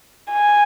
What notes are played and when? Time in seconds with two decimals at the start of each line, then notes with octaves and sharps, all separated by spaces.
0.32 G#5